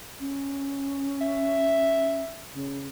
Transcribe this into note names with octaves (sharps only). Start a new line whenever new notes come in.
C#4
E5
C#3